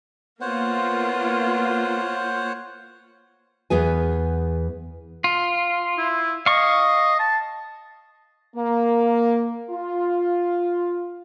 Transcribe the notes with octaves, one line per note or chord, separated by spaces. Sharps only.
A#3 B3 F4 C5 C#5 F#5
E2 B3 G#4 G#5
F4
E4
D#5 F5 C#6
A5
A#3
F4